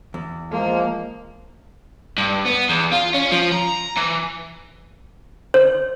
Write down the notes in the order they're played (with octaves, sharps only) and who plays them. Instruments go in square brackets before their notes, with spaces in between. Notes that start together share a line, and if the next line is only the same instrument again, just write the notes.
[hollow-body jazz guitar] E2
[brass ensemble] F3 G#3 [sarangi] A#3
[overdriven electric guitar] G2
B3
E2
F4
C#4
F3
A#5
E3
[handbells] C5